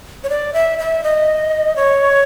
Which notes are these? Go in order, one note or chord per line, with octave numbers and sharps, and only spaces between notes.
C#5
D5
E5
E5
D#5
C#5